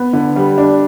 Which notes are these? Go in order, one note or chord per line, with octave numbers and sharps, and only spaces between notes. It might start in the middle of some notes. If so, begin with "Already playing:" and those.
Already playing: B3
D3
G3
D4